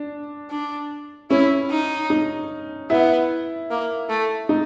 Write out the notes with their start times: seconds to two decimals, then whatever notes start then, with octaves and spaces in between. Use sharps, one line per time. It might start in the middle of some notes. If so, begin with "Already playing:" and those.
Already playing: D4
0.50 D4
1.30 C#4 E4
1.70 D#4
2.10 D#4
2.90 B3 E4
3.70 A#3
4.09 A3
4.49 D#4